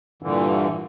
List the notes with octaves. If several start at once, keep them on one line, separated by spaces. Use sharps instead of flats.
G2 A#2 D3 E3